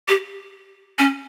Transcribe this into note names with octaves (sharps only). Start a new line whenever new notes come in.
G4
C#4